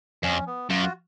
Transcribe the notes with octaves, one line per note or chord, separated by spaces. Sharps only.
F2 C#4
B3
F#2 F4
F#4